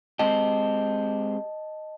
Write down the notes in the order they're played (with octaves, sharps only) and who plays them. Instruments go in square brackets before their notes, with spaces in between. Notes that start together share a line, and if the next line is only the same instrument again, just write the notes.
[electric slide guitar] G#3 C4 G4 [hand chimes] D#5 A5